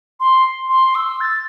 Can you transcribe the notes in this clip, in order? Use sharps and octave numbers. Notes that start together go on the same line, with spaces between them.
C6
C6
E6
A6